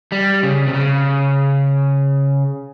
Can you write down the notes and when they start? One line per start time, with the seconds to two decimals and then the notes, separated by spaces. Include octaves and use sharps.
0.12 G3
0.43 C#3
0.67 C3
0.74 C#3